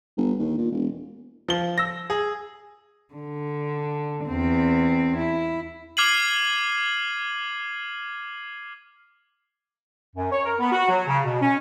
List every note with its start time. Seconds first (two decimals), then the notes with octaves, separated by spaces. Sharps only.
0.17 G1
0.39 D#2
0.58 A#2
0.72 E1
1.48 F3 G7
1.78 E6 A#6
2.10 G#4
3.14 D3
4.26 E2 C4
5.17 E4
5.97 D6 F6 G#6 C7 D#7 F#7
10.16 F#2
10.32 C#5
10.46 A#4
10.59 B3
10.72 F#4
10.89 F#3
11.07 C#3
11.25 B2
11.42 C#4